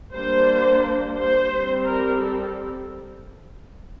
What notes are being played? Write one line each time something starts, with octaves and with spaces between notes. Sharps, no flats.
G3 A#3 D4 C5
C5
G3 C4
A#4
A4